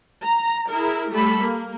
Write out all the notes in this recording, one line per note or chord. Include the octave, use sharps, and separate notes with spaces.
A#5
E4 G#4 A#4
G3 A3 A4 B5
A#3